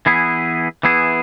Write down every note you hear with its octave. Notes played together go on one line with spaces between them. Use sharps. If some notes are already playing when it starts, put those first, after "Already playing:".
E3 B3 E4 G#4
E3 B3 E4 G#4